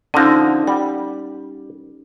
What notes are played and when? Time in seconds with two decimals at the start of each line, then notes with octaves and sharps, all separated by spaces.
0.14 D3 F3 C#4 D#4 A#6
0.67 G3 F#5